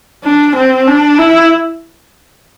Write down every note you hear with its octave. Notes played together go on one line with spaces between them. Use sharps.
D4
C4
D4
E4